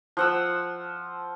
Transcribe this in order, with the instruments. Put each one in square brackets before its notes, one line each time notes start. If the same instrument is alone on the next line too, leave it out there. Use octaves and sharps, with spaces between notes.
[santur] F3 F#5 E6